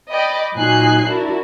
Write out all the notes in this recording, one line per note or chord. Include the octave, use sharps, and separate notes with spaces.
D5 D#5 G5 B5
A#2 F#3 D#4 G#5 F#6 C7
D4 E4 F#4 A#4